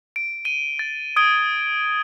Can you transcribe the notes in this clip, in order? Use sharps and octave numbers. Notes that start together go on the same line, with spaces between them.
D7
D#7 G7
A6
D#6 G#6 D7 G7